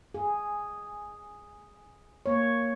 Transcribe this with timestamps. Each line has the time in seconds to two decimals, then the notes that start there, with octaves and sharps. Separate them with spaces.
0.14 G#4
2.26 A#3 C#5